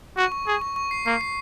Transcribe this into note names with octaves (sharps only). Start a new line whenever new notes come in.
F#4 C#6
C#6
G#4 C#6
C#6
C#6
C7
A#3 C7
C7